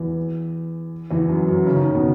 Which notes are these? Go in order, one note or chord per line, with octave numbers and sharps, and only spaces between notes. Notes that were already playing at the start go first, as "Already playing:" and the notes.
Already playing: E2 E3
E2 E3
F#2 F#3
F#2 F#3
C#3 C#4
D#3 D#4
C#3 C#4
B2 B3